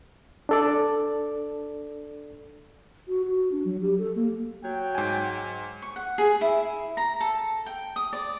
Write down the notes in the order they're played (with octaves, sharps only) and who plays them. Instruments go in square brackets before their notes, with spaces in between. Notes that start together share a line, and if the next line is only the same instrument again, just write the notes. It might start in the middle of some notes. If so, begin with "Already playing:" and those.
[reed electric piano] D4 A4 D5
[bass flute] F#4
F#4
D4
F#3
G4
A4
A#3
[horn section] F#3 C#5 G5
[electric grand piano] G#2 G#5
[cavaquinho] C#6
F#5
G#4
E4
A#5
A4
G5
D#6
D5